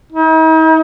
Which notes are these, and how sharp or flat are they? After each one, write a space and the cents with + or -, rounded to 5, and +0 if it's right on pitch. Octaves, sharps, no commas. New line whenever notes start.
D#4 +45